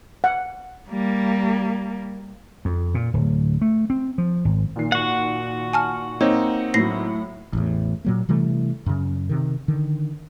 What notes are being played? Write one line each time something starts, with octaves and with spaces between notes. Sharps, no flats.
F#5
G3 A#3
F2
A#2
D1
A3
C4
F3
G#1
A#2 D#3 C7
F#4 F#5
G#5 A5 F6
A#3 C4 D#4 C#5
A2 F#3 A#6 C7
A1 E2 A2
A#2 F#3 A#3
C3 E3 G3 A3
F#2 C#3
C3 D#3
D3 D#3